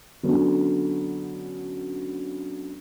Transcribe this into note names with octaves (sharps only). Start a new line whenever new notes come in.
D3 F#3 B3 C#4